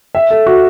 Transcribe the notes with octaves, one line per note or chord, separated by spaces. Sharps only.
E5
A4
F#4